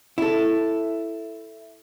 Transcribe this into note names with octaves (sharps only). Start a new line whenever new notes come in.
E4 A4